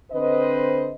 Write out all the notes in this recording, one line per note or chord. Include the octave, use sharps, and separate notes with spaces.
D3 C4 B4 C5 D#5